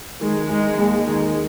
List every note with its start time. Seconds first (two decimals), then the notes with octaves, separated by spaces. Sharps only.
0.21 D#3 G#3
0.49 G#3 D#4
0.77 D#2 G#3
1.07 D#3